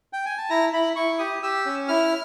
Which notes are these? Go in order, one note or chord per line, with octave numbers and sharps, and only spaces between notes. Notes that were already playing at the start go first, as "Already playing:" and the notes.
G5
G#5
A5
E4 A#5
E4 B5
E4 C#6
G4 D#6
G4 E6
C#4
E4 F6